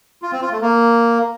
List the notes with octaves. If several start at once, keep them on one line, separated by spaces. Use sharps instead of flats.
F4
C4
F4
A3
A#3